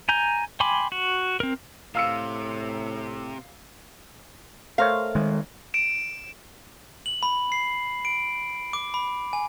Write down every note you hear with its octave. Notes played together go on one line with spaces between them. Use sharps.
G#5 A#5 G6
G5 G#5 B5 C6 D6
F#4
C4 A#4
A2 C3 F5 E6 C#7
A3 A#4 C5 C#5 F5
D#3 G#3
D7 E7
F#7
B5
C7
D7
D6
B5
G#5